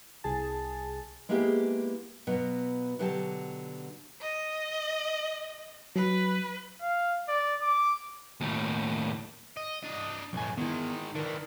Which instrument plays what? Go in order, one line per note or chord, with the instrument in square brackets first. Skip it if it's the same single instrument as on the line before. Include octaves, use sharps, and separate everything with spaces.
[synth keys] C2 G#4 A5
[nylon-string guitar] G#3 A#3 B3 E4 G4 G#4
B2 F#3 B3 F4
B2 D3 F#3 G4 G5 A5
[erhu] D#5
[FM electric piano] F#3 [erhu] B4
[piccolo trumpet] F5
D5
D6
[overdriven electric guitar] D#2 A2
[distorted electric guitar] D#5
D4 D#5
[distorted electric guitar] B1 A2 [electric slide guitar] F2 G#5
[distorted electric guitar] D#3 G#3 [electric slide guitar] B3 E4
[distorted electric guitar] D#3 E3 [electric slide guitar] D4 A#4